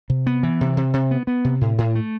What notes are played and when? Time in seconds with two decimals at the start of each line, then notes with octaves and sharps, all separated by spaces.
0.10 C3
0.27 B3
0.43 E3
0.61 C3
0.77 C3
0.93 C3
1.11 B3
1.27 B3
1.44 C3
1.61 A2
1.78 A2
1.95 A3